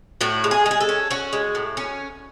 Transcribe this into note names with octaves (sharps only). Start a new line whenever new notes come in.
A2 F#4
G#3
G#4
G#3
G#4
A4
C#4
C#4 F#4
G#3
A2
C#4